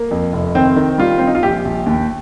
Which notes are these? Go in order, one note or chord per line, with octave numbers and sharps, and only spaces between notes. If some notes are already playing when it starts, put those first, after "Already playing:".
Already playing: A#3
F2
F1
D#3 C4
D#3
G3 F4
G3 C4
D#4
F4
A#1 G4
A#1
D#2